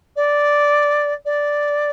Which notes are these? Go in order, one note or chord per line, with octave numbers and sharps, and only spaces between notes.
D5
D5